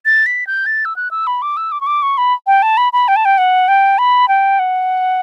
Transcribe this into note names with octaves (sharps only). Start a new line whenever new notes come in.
A6
B6
G6
A6
E6
F#6
E6
B5
D6
E6
D6
C#6
D6
C#6
B5
G5
A5
B5
B5
G5
A5
G5
F#5
G5
B5
G5
F#5